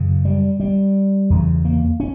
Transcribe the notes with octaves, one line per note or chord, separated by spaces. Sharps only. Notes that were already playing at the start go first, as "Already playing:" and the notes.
Already playing: F#2 C#3
G3
G3
E2 C#3
A#3
C#4